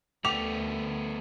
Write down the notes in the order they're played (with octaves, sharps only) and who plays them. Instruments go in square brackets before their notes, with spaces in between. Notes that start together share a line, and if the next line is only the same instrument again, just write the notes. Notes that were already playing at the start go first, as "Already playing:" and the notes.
[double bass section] D2 [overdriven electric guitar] A3 B3 [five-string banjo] G4 [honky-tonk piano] F7